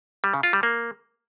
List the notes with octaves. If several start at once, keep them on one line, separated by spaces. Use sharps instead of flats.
G3
C#3
F4
G3
A#3